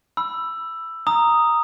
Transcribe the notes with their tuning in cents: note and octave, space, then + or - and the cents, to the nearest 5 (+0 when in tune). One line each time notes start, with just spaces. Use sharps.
B5 +0 E6 +10
A#5 +0 D#6 +0